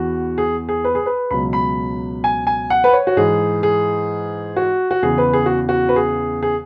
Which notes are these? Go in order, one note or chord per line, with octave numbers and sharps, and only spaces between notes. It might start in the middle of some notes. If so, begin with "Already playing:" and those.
Already playing: E2 E3 F#4
G#4
G#4
B4
G#4
B4
C#2 B2 F#3 B5
B5
G#5
G#5
F#5
B4
C#5
F#4
G#2 E3 G#4
G#4
F#4
F#4
E2 C#3 E3 G#4
B4
G#4
F#4
F#4
B4
G#4
G#4